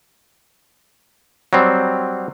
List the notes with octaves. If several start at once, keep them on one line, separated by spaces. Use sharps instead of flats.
F#3 G3 C4